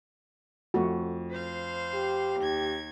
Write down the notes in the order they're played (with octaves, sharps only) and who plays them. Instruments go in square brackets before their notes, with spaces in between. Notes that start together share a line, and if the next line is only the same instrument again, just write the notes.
[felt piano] F2 F3 [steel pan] A3 F#4
[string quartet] C5 F5
[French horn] G4
[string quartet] D#2 G#6